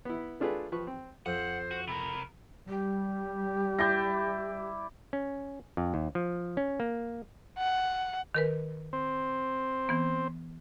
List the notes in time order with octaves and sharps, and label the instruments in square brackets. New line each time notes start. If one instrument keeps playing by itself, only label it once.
[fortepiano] B3 E4
A3 D4 F4 G#4 A4 B4
F3 B4 C#6
C4
[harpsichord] F2 [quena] C5 [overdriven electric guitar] F#5
[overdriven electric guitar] F#4
[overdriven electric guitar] C3 A#4 [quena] B5
[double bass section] G3 [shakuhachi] G4
[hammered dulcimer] E4 D5 [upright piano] G6 A#6
[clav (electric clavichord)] C#4
F2
D#2
F3
C#4
A#3
[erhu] F#5
[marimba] D#3 A#4 B4
[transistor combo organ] C4
[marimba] E3 B3